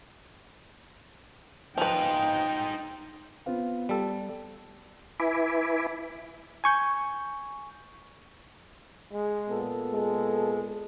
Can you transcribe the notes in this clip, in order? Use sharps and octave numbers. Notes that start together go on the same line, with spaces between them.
F3 D#4 B4 C5 G5
B3 C4 F4
G3 A4
E4 B4 E5 G#5 B5 D6
G#5 C#6 G6
G#3
A#2 B3 A4
G#3